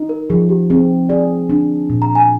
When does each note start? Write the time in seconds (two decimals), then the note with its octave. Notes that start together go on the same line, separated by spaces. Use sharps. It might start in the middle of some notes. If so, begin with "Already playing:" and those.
Already playing: D#4
0.09 A#4
0.30 F3 G#4
0.49 G4
0.70 C4 G#4
1.09 G#4 D5
1.49 D4
1.90 A#2
2.02 A#5
2.15 G#5